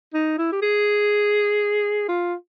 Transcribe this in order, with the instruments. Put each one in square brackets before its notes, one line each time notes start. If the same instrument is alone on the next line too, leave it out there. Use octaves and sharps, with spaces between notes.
[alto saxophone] D#4
E4
G4
G#4
F4